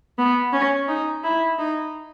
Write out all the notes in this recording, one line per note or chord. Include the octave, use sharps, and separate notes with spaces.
B3
C#4
D#4
E4
D#4